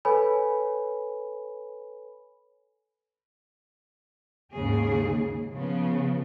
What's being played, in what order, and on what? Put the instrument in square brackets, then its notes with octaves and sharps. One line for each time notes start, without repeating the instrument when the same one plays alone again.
[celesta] A4 B4 C#5 G#5 B5
[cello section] D#2 G#2 C#3 G#4
C#3 F3 B3